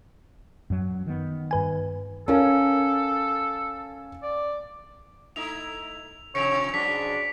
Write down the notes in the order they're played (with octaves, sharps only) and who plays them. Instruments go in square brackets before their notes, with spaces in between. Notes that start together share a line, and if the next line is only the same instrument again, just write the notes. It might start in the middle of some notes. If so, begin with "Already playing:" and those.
[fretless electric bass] F#2 F#3
D#3 B3
[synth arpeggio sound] G2 B4 G#5
[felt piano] C#4 A#4 [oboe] A4 [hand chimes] F5 G#5 A5
[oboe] D5
[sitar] A3 D#4 E4 [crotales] F7
[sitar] C3 F3 [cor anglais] C#5 [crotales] C#7 D7 F7
[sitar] G#2 F#3 G#3 [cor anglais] D4 [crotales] B6